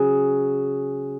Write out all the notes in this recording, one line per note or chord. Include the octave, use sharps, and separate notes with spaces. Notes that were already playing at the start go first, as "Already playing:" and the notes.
Already playing: C#3 F#3 G#4